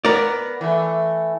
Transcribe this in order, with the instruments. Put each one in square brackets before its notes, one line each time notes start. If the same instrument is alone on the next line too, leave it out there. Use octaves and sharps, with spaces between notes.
[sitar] B3 [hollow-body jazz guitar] A#4 D5
[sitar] E3 A3